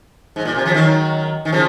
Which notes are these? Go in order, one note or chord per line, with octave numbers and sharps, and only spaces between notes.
G#2
A#2
C3
C#3 F3
D#3 F#3
D#3
C#3 F3